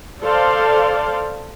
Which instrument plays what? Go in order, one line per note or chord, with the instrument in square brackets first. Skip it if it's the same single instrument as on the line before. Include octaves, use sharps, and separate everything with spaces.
[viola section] A4 C5 D5 F5